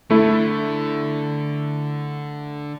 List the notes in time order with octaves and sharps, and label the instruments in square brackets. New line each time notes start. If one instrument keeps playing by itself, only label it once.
[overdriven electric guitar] D3 [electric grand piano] A3 E4